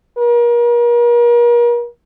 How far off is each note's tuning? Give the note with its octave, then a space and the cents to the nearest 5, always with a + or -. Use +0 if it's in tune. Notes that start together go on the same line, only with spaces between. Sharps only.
A#4 +40